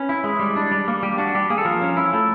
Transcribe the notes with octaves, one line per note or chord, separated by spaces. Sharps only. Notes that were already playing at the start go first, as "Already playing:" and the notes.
Already playing: C#4 B4
E4
G#3
G3
D4
G3
A#3
G3 G4
D4 F#4
G3 G4
A#3 G#4
A4
F3 A#4
C#4
E4
A3